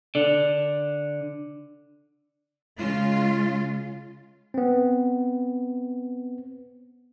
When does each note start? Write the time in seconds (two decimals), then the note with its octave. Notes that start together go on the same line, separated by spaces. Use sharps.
0.15 D3 D5
2.76 C#3 G#3 F4
4.54 B3 C4